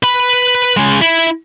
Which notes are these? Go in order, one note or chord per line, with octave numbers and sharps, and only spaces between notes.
B4 B5
C#3 G#3
E4